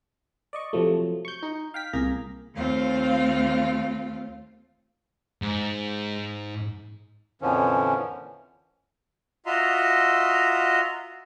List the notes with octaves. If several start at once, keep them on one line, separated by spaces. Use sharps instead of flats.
D5 D#5 C#6
C3 F3 F#3 A3
C#6 G6
D#4
F5 G5 B6
C2 A#3 G#4 A#5
D#2 A3 C4 F4 F5
G#2
F2 A#2 D3 E3 F3 C#4
F4 F#4 D#5 E5 A#5 C6